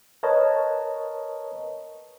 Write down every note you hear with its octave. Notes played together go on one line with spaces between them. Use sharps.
A#4 B4 C#5 D#5 A5